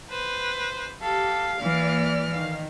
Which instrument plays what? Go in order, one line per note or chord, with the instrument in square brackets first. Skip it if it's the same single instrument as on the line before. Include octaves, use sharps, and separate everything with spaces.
[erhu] B4 [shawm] C5
[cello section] G4 [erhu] A4 [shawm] F5
[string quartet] E3 [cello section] A#3 D5 [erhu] F6
[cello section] D#3 [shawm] F5